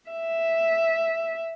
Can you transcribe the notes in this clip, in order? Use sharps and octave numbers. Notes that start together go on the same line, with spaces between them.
E5